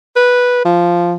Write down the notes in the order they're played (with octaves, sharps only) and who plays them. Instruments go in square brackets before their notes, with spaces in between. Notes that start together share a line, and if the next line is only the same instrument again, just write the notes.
[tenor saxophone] B4
F3